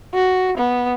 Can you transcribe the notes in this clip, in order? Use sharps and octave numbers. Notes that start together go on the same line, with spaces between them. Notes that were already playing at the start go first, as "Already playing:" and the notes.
F#4
B3